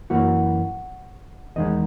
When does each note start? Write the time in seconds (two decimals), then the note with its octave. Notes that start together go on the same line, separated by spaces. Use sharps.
0.10 F#2 E3 A#3 F#4
1.56 E2 D#3 G#3 D#5